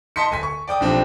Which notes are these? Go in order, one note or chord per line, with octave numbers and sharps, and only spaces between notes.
D#5 A5 C6 B6 C#7
D1 G#5 B6
C#6
D5 G5 D6 D#6
B1 F3 C4 D4 G4 D6